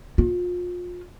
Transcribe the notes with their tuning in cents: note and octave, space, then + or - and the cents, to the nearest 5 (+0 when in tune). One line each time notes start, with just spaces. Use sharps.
F4 +30